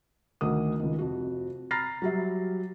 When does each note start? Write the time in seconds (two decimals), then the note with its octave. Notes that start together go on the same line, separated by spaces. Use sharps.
0.41 D2 D#3 A#4 D#6
0.79 C#2 D#3
0.98 F2 C3 F#4
1.71 A#5 B5 F6 A6 A#6 C7
2.02 F#3 G3 E5